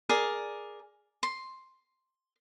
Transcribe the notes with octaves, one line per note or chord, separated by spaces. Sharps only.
G#4 A#4 D5
C6